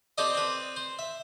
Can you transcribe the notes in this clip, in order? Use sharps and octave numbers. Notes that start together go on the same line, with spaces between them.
C4 G4 A4 D5 D#5
C4 B4
C5
E5